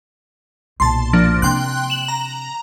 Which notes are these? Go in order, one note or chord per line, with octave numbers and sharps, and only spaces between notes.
B1 A#2 A5 C6
F3 A#3 D4
C3 G5 C6 F#6
E7 F#7
A#5